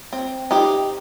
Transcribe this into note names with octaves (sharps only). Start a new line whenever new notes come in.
C4
D#4 G4 C5